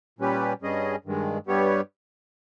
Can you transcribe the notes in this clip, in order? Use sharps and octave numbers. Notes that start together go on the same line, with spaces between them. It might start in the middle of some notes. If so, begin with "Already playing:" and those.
A#2 G3 C#4 G4 B4
G2 G3 C#4 G#4 D#5
G2 D#3 G#3
G2 G3 B3 G4 C#5